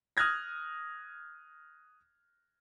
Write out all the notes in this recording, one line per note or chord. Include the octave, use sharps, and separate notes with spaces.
D#6 F6 F#6 G#6 A#6